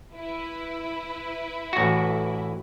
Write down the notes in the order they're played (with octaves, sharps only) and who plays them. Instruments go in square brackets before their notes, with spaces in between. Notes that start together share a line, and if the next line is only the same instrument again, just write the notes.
[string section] E4 B4
[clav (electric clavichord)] A1 F#4